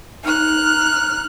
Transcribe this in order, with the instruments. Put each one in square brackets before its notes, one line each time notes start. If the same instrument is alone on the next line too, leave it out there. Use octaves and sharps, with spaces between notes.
[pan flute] D#4 [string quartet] F6 F#6